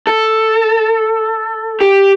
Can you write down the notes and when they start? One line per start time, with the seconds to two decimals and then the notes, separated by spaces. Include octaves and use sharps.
0.07 A4
1.81 G4